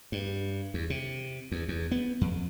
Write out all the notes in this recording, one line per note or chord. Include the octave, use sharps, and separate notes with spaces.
G2
E2
C3
E2
E2
B3
F2